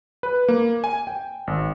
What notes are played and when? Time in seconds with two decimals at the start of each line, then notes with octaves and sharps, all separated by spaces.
0.23 B4
0.48 A#3
0.84 G#5
1.07 G5
1.47 G#1